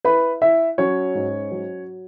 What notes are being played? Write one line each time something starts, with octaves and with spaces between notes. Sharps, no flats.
E4 B4 B5
E4 E5
F#3 C#4 C#5
G#2
F#3